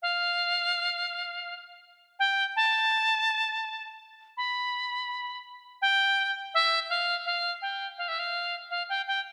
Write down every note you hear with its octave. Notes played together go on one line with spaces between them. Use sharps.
F5
G5
A5
B5
G5
E5
F5
F5
G5
F5
E5
F5
F5
G5
G5